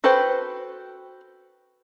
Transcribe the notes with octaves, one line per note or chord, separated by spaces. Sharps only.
F#4 A4 B4 C5 G5